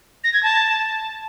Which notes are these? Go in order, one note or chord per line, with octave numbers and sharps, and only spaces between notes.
A#6
G#6
A5